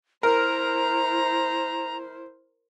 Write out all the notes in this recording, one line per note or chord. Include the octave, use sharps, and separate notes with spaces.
E4 A#4 C5 A#5